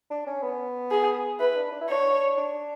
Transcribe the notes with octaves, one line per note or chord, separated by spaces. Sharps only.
D4
C#4
B3
G#4
E4 B4
D4
D4
E4
D4 C#5
D4